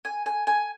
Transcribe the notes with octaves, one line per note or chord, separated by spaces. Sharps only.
G#5
G#5
G#5